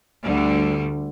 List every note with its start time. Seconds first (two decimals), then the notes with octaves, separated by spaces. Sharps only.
0.24 D2 D3 G3